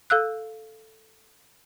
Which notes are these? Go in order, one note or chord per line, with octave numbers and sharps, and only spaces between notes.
A4 F5 E6 F#6